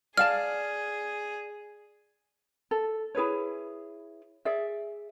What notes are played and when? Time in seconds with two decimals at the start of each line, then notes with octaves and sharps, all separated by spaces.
0.17 G#4 D5 F5 A5 F6
2.71 A4
3.15 E4 G#4 B4 C#5
4.45 G#4 D5 E5